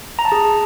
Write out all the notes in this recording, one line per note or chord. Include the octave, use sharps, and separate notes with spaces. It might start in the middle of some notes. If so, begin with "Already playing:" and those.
A#5
A5
G#4